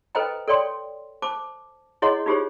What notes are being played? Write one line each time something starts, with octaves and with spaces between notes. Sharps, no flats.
A4 B4 C5 D#5 G5 A#5
A4 C#5 D5 G5 C6
C5 A5 D6
E4 G#4 C#5 D#5 F#5 C6
D#4 F4 G4 G#4 C5 C#5